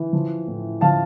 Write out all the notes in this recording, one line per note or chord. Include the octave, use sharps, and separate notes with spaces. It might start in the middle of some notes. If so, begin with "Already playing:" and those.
Already playing: E3
F3
A2
F3 F5 A5